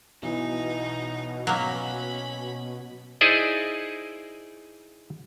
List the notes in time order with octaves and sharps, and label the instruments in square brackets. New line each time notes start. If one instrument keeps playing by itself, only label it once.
[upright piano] B1 E3 [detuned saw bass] B2 [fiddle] D#4
[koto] F#3 A#3 [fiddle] C#4 B5
[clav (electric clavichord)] D#4 E4 G#4 C5 D5 D#5